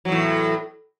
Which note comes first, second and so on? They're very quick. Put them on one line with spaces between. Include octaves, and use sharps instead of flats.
F#3 E2 A2